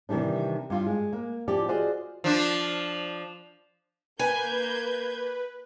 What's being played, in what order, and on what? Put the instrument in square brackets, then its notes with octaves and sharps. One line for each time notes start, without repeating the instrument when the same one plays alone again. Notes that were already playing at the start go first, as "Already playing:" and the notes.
[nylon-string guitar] C3 D#3 E3 G3 D4
G2 F4
G#3
A#3
F3 C#4 G4 D5
F4 F#4 G#4 C5 D5 D#5
[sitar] F3 D4
[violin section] A#3 G6 G#6 [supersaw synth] B4 [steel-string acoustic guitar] G#5